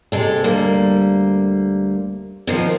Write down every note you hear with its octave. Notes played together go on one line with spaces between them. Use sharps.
C3 G#3 A4
D2 G3 A#3
B2 D#3 F3